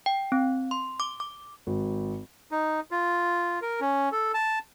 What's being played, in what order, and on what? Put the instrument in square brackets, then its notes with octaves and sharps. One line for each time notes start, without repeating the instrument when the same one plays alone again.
[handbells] G5
C4
C6
D6
D6
[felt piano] G#1
[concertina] D#4
F4
A#4
C#4
A4
A5